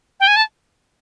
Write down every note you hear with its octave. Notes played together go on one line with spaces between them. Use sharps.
G5
G#5
A5